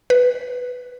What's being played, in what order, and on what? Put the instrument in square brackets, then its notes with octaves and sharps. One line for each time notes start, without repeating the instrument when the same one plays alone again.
[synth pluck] B4